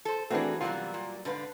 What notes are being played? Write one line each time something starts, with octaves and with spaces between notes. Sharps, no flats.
A4 C5
E3 A3 C4 D4 F#4 G#4 A#4 B4
C3 E3 F#3 G3 B3 F4 A#4
A#2
G#2 D3 B4 F5